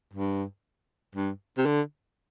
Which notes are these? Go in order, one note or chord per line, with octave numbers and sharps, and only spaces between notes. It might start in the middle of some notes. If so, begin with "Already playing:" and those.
G2
G2
C3
D3